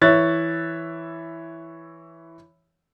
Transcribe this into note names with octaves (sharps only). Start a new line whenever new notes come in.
E3 C#5 E5 F#6 A6